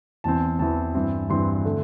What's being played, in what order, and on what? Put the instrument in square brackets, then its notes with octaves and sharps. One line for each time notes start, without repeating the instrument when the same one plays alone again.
[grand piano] E2 E3 C4 A5
E2 E3 C4 A5
G2 E3 C4
G2 E3 C4 C6
D3 A3